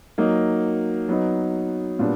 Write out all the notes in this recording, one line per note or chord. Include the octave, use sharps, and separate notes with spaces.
F#3 A#3 D#4
F#3 B3 D#4
A#2 G3 B3 D4